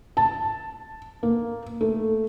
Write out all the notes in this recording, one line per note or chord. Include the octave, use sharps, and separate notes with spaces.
A5
A#3
A3